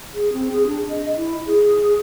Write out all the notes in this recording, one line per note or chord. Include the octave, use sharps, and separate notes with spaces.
G#4
C4
G#4
D4
D#5
E4
G#4